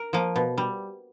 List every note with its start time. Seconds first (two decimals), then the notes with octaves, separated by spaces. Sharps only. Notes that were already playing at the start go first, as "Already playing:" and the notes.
Already playing: A#4
0.13 F3 A#3
0.36 B2
0.58 G3